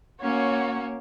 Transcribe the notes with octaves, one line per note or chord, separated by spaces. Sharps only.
A#3 C#4 F#4 C#5